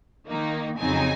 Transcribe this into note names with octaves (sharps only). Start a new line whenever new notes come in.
D#3 A#3 D#4
F2 C#3 F#3 C4 D#4 G#5